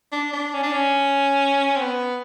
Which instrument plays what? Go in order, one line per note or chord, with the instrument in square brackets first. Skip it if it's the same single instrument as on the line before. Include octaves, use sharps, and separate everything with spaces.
[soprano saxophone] D4
D4
C#4
D4
C#4
C4
B3